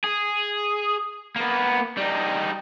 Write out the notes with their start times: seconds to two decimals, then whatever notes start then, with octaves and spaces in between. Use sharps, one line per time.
0.04 G#4
1.36 A#3 B3
1.97 G3 D#4